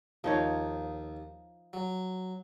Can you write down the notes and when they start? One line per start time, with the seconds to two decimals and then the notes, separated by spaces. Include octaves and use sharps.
0.24 D#2 F3 D#4 C#5
1.73 F#3